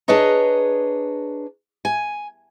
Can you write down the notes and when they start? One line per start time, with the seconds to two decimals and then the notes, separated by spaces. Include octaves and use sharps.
0.08 D4 G#4 B4 C#5 D#5 A#5
1.85 G#5